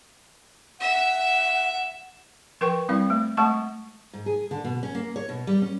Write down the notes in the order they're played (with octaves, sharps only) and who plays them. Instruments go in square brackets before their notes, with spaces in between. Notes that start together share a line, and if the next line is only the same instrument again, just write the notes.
[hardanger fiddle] E5 [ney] F#5
[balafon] F3 A#4 B4 G5 C#6
G3 C4 E4 F5
A3
G#3 A3 F#5 A5 C#6
[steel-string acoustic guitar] G#2
G#4
D3
B2
C#4
A#3
C#5
B2
G3
C#4